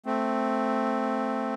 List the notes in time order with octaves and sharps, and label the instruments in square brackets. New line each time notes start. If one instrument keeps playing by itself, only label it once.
[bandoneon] A3 C4